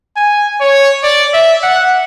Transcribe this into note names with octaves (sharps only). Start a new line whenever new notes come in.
G#5
C#5
D5
E5
F#5